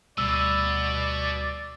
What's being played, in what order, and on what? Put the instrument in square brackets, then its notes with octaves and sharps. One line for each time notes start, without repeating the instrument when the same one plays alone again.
[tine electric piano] D2 G3 [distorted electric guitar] B2 [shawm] D5 [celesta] E6